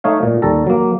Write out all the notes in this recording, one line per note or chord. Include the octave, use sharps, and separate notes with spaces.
A3 D#4 C#5 F5
A#2
D#2 G3 A4 A#5
F#3 A#3